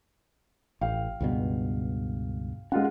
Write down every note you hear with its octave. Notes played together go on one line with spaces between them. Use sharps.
A1 F5 G5
C#2 G2 B2
G#3 C#4 F4 F#5